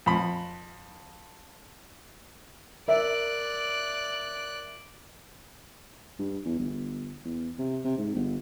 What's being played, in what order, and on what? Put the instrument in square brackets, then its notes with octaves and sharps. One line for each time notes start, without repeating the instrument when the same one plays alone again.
[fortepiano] F2 B5
[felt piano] A#4 E5 [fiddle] D5 F#6
[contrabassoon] G2
E2
G1
E2
C3
C3
G#2
G1